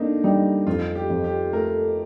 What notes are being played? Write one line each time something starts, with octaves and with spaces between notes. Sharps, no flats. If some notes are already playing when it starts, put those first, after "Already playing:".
Already playing: D3 A#3 C4 D4 D#4
G3 D#4
F2 F4
G4
F2
G4
A3 A#4